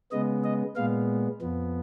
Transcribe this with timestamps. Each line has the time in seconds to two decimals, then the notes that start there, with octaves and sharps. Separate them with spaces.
0.12 C#3 G#3 B3 D#5
0.44 D#5
0.76 A#2 G#3 B3 F5
1.41 F2 F3 B3